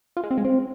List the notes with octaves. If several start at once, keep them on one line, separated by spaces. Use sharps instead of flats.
F4
G#3
C4
G#3
C4